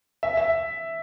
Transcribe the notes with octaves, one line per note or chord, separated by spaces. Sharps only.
E5
E5